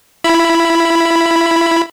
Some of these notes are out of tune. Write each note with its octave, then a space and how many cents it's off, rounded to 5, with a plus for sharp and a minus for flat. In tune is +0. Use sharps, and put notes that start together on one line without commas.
E4 +25 B5 +0